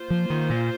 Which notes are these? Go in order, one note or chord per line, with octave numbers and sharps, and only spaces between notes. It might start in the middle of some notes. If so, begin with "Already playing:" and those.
Already playing: A#3 F4 C5
F3
D#3
A#2